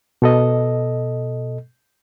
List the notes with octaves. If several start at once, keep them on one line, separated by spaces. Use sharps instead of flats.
B2 A4 D#5